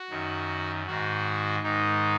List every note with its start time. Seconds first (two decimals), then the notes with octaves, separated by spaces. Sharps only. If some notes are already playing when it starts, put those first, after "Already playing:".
Already playing: F#4
0.10 F#2 D#3
0.86 G#2 D#3 F#4
1.63 G#2 D#3 D#4